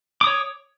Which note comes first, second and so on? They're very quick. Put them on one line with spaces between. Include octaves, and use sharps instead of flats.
D6 D#6 C#5